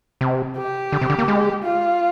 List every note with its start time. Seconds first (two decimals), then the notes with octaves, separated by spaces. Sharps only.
0.21 C3
0.57 G4
0.92 D3
1.02 C3
1.10 D3
1.19 A#3
1.28 G#3
1.63 F4